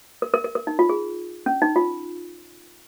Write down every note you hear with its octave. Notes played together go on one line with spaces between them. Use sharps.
A#4
A#4
A#4
A#4
D#4
F4
G#4
C#4
D#4
F4